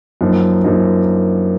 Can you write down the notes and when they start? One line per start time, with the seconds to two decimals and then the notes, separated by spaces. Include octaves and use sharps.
0.21 F#2 F3 A#3 D#4
0.64 F#2 F3 A#3 D#4